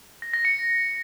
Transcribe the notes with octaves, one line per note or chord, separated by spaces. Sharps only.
A#6
A#6
C#7